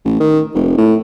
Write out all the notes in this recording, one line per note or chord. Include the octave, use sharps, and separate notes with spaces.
A1
D#3
F1
A2